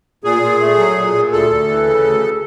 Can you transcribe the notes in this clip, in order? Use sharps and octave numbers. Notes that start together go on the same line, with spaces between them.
A#2 G#4
A#2
A3
F#3
A#2
A#2
D2 A4
D2
E3
C#3
D2